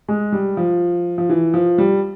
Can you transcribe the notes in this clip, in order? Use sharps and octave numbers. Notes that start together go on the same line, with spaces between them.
G#3
G3
F3
F3
E3
F3
G3